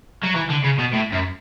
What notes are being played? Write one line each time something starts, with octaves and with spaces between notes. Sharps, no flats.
F#3
E3
D3
C#3
B2
A2
F#2